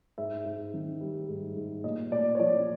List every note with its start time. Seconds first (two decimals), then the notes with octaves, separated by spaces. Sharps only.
0.18 G#2 E5
0.46 G#2
0.74 D#3
1.01 G3
1.29 G#2
1.57 G#2
1.84 A#2 D#5
2.11 A#2 D5
2.35 C#5
2.39 F3 D5